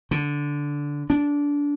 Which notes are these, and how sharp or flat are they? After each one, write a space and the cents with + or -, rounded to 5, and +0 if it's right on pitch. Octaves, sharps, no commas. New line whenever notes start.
D3 -10
D4 -20